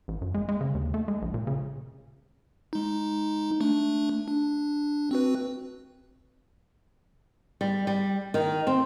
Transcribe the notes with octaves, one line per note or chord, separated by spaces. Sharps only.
A1
F#2
G#3
G#3
C#3
D#2
A3
G#3
A#1
A#2
C#3
G#3 D#4
A3 D4
D4
C4 F#4 B4
G3
G3
D#3
C4